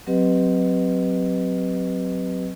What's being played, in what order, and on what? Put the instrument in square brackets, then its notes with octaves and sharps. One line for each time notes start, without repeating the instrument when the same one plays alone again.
[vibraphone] F#3 C4 G4 B4 D#5